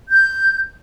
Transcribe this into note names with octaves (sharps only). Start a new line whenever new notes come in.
G6